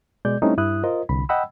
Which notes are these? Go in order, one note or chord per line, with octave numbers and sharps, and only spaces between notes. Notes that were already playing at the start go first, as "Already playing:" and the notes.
B2 G#3 D5 G6
G3 A3 C4 C#4 D#4 E4
G2 E4 D#6 F#6
F4 A#4 C5 D#5
C2 D3 B5
D#5 F#5 G5 B5 E6